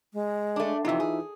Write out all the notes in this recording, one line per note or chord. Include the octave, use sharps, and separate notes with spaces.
G#3
A3 D4
F2 C3 E3 D#4 F4 E5
G#4